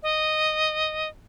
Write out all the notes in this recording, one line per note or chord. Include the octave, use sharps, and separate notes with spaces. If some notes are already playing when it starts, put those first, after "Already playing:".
D#5